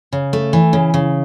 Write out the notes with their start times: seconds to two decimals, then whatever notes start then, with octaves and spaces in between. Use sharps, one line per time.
0.13 C#3
0.33 A3
0.53 E3
0.73 C#3
0.94 C#3